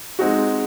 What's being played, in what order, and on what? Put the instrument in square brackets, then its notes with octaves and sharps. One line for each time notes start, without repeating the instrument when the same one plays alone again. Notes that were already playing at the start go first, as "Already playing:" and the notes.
[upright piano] G#3 C4 D#4 F#4